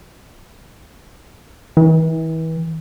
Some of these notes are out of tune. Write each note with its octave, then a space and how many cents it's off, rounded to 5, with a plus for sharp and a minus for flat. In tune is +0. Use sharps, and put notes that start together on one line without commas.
E3 -35